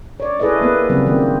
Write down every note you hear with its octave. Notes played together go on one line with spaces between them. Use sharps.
C#5 D5
E4 G#4 A4 B4 D5 D#5
A#3 B3 B4
C#3 F#3 G3 A#3 C4
D#3 A#3 C4